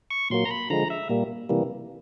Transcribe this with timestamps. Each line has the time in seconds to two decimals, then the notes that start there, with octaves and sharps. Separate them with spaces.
0.11 C#6
0.30 A#2 F#3 A#3 C6
0.45 A#5
0.51 B5
0.70 D3 F3 G#3 A#5
0.90 E5
1.09 A#2 G3 A#3
1.49 C3 E3 G3 A#3